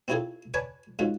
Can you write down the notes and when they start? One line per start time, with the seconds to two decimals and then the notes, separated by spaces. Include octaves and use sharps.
0.08 C4 C#4 E4 F4 G#4 A4
0.54 B4 C#5 D5 G#5 A5
0.99 G#2 C#4 F4 F#4